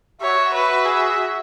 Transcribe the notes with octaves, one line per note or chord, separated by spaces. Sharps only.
F#4 C#5 E5
B4
G#4